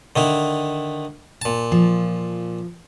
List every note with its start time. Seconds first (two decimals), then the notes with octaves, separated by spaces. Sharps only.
0.16 D3 D#3 E4
1.42 A#2 A5
1.72 F3